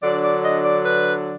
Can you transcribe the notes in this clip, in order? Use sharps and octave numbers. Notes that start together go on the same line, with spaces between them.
D3 F#3 D4 D5
D5
D#5
D5
B4